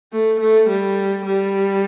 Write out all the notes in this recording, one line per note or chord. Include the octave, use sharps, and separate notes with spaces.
A3
A3
G3
G3